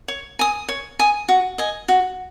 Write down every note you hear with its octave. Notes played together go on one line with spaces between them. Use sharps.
C#5
G#5 D#6
C#5
G#5 D#6
F#4
D#5 G#5
F#4